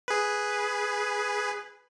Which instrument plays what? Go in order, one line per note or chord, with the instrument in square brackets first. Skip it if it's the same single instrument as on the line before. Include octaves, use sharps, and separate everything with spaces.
[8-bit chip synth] G#4 B4